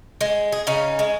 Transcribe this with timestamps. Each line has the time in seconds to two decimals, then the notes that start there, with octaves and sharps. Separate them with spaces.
0.21 G#3
0.52 G#4
0.67 C#3 C#4 D#4
0.99 G#3